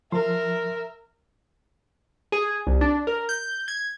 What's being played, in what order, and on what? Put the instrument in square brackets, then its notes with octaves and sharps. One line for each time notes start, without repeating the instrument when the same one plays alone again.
[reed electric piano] F3 C6 [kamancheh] A#4 E5
[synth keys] G#4
C2
D4
A#4
G6
G#6